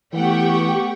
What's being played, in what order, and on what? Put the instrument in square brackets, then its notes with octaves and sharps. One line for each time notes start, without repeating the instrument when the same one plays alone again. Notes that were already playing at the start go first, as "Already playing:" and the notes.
[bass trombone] E3 [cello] A3 B3 [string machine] G4 C#6 [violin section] F#5 G5